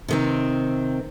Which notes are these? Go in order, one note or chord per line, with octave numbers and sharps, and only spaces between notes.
C3 D#3 C4